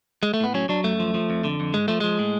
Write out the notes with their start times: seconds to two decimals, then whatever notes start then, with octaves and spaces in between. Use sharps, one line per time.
0.23 G#3
0.34 A3
0.40 A2 B3
0.54 F#3 C#4
0.69 F#3 D4
0.84 F#2 A3
1.00 F3
1.14 F3
1.30 F2
1.44 D3
1.60 F2
1.74 G#2 G#3
1.88 F3 A3
2.00 F3 G#3
2.19 A2